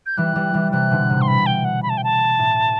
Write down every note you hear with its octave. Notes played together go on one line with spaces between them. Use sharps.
G6
E3 G3 F#6
E3 G3
E3 G3
C3 E3 F#6
B2 D3
A2 C3
C6
B2 B5
G5
F#5
B5
A5
G5
A5
A2